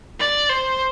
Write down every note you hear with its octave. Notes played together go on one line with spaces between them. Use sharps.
D5
C5